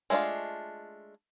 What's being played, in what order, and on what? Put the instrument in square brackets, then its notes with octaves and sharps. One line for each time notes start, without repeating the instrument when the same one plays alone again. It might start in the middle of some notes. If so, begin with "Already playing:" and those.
[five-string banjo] G#3 A3 C#4 D4 F4